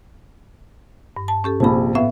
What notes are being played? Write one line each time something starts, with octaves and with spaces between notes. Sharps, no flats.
G2
A5
C#4 G4 A4
A#1 C3 A5 B5
A2 B3 E5 F5